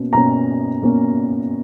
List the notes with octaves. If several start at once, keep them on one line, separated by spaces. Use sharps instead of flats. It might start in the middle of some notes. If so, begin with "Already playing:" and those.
Already playing: B2 A#3 C#4
B2 A#3 C#4 A#5
B2 A#3 C#4